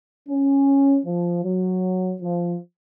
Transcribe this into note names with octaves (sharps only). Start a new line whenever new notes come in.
C#4
F3
F#3
F3